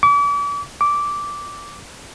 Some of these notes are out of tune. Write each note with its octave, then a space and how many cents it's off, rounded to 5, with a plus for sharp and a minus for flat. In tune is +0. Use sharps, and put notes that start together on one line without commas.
D6 -40
D6 -10